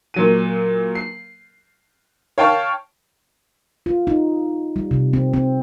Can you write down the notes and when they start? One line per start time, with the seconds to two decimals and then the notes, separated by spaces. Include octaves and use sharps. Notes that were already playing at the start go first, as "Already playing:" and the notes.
0.14 A#2 F#3 D#7
0.95 C7
2.38 C#5 F5 G5 A5 C#6 F6
3.86 F4
4.07 D#4
4.76 G3
4.91 C3
5.13 C4
5.34 C4